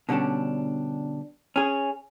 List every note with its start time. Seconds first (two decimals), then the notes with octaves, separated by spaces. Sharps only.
0.09 B2 D3 G3 C#4 D4
1.56 C#4 G#4